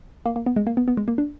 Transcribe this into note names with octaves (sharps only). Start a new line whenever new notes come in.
A#3
A#3
B3
G#3
A#3
B3
B3
G#3
A#3
D4